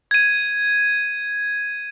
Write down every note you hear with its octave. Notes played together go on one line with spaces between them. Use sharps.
G#6 D#7